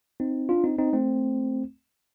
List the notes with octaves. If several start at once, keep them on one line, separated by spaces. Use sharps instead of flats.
C4 D#4
D4 F4
C4 D#4
C4 D#4
A3 C4